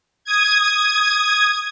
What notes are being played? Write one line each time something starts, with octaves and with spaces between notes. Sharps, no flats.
D#6 G#6